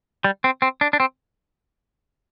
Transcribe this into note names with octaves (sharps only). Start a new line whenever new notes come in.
G3
C4
C4
D4
D4
C4